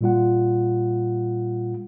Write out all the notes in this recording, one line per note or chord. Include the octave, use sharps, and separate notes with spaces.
A#2 G3 F4 F#5